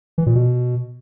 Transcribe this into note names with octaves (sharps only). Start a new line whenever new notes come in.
E3
A#2
B2